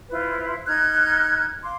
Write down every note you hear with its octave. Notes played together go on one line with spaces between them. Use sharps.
E4 F4 B4 C5
D#4 F6 F#6 G#6
F5 C6 D6